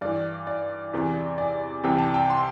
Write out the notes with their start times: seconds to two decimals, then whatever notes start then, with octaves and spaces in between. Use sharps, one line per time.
0.01 G2 E3 D5
0.47 D5
0.93 E2 C3 E3
1.38 D5
1.84 C2 C3 E3 G5
1.98 A5
2.14 G5
2.30 C6